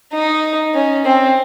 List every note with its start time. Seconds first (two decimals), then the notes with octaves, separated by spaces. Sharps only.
0.13 D#4
0.74 C#4
1.05 C4